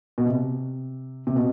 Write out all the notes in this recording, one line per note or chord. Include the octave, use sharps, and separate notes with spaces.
B2
C3
C3
B2